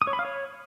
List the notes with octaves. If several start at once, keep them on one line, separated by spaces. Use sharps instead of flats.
D#6
C#5
B5
F5
C#5